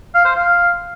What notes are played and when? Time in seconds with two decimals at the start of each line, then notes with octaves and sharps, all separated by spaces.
0.14 F5
0.25 C5
0.35 F5